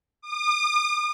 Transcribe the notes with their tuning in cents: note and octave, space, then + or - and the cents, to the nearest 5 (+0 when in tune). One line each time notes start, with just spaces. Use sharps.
D#6 -45